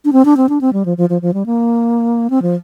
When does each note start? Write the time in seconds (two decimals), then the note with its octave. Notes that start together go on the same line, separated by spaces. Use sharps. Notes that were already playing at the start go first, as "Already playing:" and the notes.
0.05 D4
0.13 C4
0.25 D4
0.37 C4
0.49 D4
0.61 C4
0.73 G3
0.85 F3
0.98 F3
1.09 F3
1.22 F3
1.34 G3
1.46 A#3
2.30 C4
2.42 F3